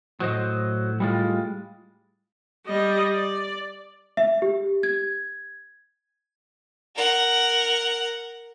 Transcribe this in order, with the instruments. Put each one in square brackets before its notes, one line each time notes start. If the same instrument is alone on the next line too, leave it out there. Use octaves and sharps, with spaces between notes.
[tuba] A2 [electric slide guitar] F#3 C5 D#5
[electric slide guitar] G3 G#3 F4
[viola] G3 D#5
D5
[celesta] E5
G4
G#6
[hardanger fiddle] A#4 F#5